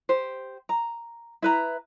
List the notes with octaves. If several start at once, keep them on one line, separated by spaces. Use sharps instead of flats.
G4 C5
A#5
E4 B4 A#5